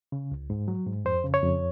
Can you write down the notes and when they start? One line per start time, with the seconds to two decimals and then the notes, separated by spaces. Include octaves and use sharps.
0.12 C#3
0.32 C#2
0.50 G#2
0.68 F#3
0.87 G#2
1.05 F2 C5
1.24 C#3
1.34 C#5
1.43 F2